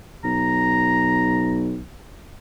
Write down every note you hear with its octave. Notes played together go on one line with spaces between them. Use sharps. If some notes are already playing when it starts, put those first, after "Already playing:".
B1 A#5